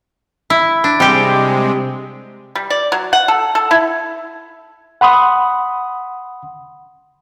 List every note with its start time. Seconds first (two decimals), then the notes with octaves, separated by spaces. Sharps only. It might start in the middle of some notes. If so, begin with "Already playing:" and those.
0.50 E4
0.84 D4
1.00 C3 G3 G#3 G4
2.55 G3
2.70 D5
2.92 F#3
3.13 F#5
3.28 A4
3.55 A4
3.71 E4
5.01 F#5 B5 C6 D#6